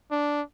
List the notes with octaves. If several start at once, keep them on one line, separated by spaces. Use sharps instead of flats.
D4